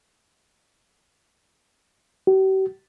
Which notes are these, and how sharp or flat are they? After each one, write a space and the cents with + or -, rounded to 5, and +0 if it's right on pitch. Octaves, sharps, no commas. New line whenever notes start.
G4 -45